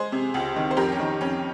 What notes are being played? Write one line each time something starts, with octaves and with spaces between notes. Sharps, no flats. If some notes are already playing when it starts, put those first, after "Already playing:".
Already playing: G#3 G#4 C5
C3
C#2
D#3
C5
F2 G4 A#4
C#4
D#3
F2 C#4